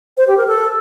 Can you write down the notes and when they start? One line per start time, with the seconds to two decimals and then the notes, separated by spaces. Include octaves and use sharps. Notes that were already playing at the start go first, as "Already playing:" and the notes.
0.17 C5
0.27 G4
0.37 A#4
0.47 A4